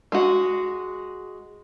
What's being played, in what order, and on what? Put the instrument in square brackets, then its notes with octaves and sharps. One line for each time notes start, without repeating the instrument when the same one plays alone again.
[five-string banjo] G#3 F#4